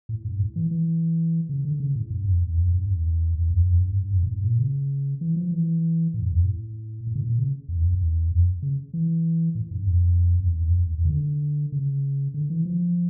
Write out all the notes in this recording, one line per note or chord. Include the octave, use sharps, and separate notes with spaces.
A2
G2
A2
E3
E3
C#3
D3
C#3
A2
G2
F2
E2
F2
G2
E2
E2
F2
F2
G2
G2
F2
A2
G2
A#2
C#3
E3
F3
E3
A2
E2
F2
A2
A2
C#3
A#2
C#3
E2
F2
E2
F2
C#3
E3
A2
G2
F2
F2
E2
F2
E2
E2
C#3
D3
C#3
D3
E3
F3